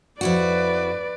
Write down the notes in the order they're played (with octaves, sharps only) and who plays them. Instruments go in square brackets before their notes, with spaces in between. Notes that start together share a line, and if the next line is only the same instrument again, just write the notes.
[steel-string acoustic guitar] F2 E4 F#4 [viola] B4 D5